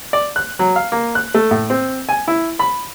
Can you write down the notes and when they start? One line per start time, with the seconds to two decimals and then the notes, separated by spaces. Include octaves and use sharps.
0.13 D5
0.36 F#6
0.59 F#3
0.76 F5
0.92 A#3
1.15 F#6
1.34 A3
1.51 A2
1.70 C4
2.09 G#5
2.28 E4
2.59 B5